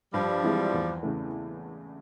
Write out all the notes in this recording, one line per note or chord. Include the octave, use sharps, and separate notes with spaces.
G2 F3 G3
E3 G#3 C4 E4
E2
C#3 E3 A3